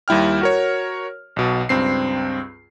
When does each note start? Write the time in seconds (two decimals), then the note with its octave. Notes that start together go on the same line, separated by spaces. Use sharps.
0.08 D#2 G3 E4 G5 F6
0.41 F#4 A#4 C#5
1.36 B1 B2
1.69 C#2 G2 C4 C7